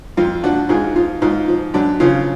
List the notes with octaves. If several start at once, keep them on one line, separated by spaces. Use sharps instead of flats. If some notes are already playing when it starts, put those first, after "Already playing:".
F2 F4
F3 D4 F#4
G#2 F4 G#4
F3 F4
G#2 F4
F3
F#2 D4
C#3 F3 F4